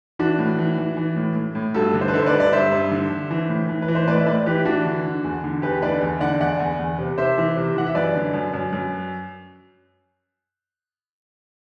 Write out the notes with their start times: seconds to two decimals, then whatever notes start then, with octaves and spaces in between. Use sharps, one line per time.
0.19 E3 D4 F#4
0.38 A2
0.58 E3
0.78 E3
0.97 E3
1.16 A2
1.35 A2
1.55 A2
1.74 G2 F#4 A4
1.94 D3
2.01 C5
2.08 B4
2.13 D3 A4 C5
2.26 B4 D5
2.33 G2
2.40 D5
2.52 G2 C5 E5
2.72 G2
2.91 D3
3.10 D3
3.31 E3
3.49 A2
3.69 E3
3.82 B4
3.88 E3
3.95 C5
4.07 A2 B4 D5
4.17 E5
4.26 A2 B4 D5
4.46 E3 G4 B4
4.65 E3 D4 F#4
4.85 D3
5.05 D3
5.24 E2
5.44 D3
5.62 E2 G4 B4
5.82 D3 B4 D5
6.01 E2
6.20 D3 D5 F#5
6.40 E2 D5 F#5
6.59 E2
6.79 E2
6.98 C3
7.18 C3 C5 E5
7.38 E3
7.57 C3
7.76 E3 F#5
7.87 E5
7.95 F#2 B4 D5
8.14 D3
8.34 F#2
8.54 F#2
8.73 F#2